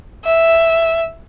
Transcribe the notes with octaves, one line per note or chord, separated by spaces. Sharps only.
E5